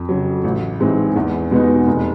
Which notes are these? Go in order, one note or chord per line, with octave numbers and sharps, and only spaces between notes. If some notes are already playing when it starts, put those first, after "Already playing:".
Already playing: F2
C#3 F#3
A1
G#2 E3 G#3 C4
E2
B2 G#3 B3 D#4
F1